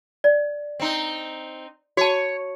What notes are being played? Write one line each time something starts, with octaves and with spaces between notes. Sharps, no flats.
D5
C4 D#4
F#4 C#5 A5